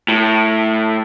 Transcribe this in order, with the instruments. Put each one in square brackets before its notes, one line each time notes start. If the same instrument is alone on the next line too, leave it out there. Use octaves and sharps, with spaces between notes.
[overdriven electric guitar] A2